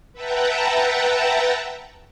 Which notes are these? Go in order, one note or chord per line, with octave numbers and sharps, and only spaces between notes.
B4 E5 F#5 G5 A5 A#5